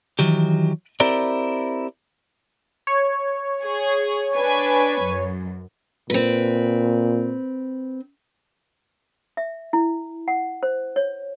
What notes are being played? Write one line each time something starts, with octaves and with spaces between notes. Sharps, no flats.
D#3 E3 F#3 G4
C4 E4 G4 A#4 C5 D5
C#5
G#4
D4 B4 G#5
F#2
A#2 C4 B4
E5
E4
F#5
C5
C#5